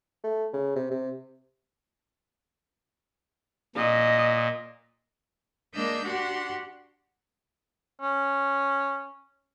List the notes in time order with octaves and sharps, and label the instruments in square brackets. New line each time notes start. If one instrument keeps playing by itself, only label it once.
[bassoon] A3
C#3
C3
C3
[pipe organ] A#2 [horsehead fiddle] D#5
[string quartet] G#3 A#3 D4 D#5 E6 G6
D4 F#4 G4 F#5 C6
[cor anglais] C#4